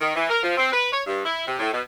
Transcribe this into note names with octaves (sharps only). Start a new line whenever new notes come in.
D#3
E3
A#4
F3
C4
B4
C#5
G2
E4
C3
A2
B2